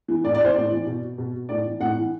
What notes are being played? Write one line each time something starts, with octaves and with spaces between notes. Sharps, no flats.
E3
A2 D5
D5
E3 C5
A2 D5
E3
B2
B2
A2 D5
E3
A2 F#5
E3